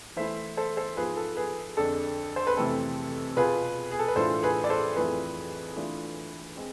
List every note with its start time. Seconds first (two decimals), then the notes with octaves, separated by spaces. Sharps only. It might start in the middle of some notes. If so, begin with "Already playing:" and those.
0.16 E3 A3 E4 C5 E5
0.57 A4 C5
0.77 A4 C5
0.97 G#2 F3 B3 F4 G#4 B4
1.17 A4
1.37 G#4 B4
1.77 F2 D3 G#3 D4 A4
2.36 C5
2.47 B4
2.57 F2 C3 E3 A3 C4 A4
3.37 B2 B3 F4 G#4 B4
3.91 G#4
3.99 A4
4.08 B4
4.16 A2 E3 G#3 D4 F4 A4 C5
4.43 G#4 B4
4.64 D5
4.70 A4 C5
4.96 F2 E3 A3 C4 F4 G#4 B4
5.76 E3 A3 D4 F4
6.57 G#3 C4